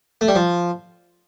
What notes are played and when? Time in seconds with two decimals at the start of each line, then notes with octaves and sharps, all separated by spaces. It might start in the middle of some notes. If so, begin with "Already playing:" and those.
0.21 A3
0.28 G3
0.35 F3